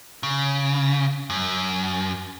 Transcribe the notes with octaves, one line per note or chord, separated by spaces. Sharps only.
C#3
F#2